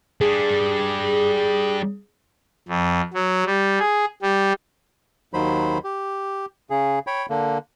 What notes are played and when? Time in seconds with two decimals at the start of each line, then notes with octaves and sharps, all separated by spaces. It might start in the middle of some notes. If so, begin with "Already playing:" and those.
0.21 G3 D4 G#4
2.69 F2
3.14 F#3
3.46 G3
3.80 G#4
4.22 G3
5.34 D#2 D#3 F#3 C5 B5
5.84 G4
6.70 C#3 G#4
7.07 C#5 G5 B5
7.30 D3 A#3